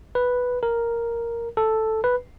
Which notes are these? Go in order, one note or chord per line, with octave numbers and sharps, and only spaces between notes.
B4
A#4
A4
B4